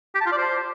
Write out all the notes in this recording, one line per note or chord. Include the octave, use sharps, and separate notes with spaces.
G4
A5
F4
D5
C5